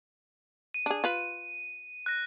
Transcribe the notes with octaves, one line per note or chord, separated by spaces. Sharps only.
D#7
D4 G#4
F4 B4
F#6 A#6